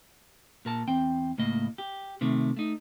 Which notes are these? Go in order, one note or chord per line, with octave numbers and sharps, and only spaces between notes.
A#2 A#4 A5
E2 C4 G5
C#2 A2 A#3 D#5
G4
C3 D#3 A3
A3 D#4